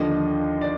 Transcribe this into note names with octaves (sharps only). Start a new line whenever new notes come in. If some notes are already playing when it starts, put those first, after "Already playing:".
Already playing: D#2 D3 F3 D#5
D5